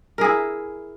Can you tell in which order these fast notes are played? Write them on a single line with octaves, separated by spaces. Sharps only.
A#4 G#4 E4